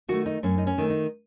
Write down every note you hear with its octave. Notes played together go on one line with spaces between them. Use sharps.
D#3 A3 F#4
D#4
F#2 C#4
D#4
C#4
D#3 A3
D#4